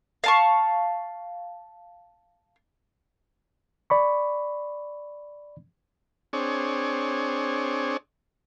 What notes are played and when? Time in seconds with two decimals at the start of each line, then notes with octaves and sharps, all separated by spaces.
0.24 F5 A5 C#6
3.90 D5 B5 C#6
6.33 C4 D4 G#4 C#5